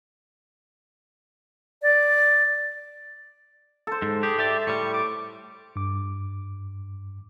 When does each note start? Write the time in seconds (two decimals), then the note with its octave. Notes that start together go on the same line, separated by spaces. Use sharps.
1.82 D5
3.87 A4 C5
4.02 G#2
4.23 G4 G#4
4.38 G4 D5 E5
4.67 A2 G3 C#6
4.94 D6
5.76 G2 D6